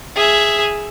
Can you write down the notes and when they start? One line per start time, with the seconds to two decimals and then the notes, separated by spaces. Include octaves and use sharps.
0.16 G#4 E5